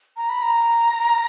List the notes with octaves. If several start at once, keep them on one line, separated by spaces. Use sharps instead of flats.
A#5
B5
A#5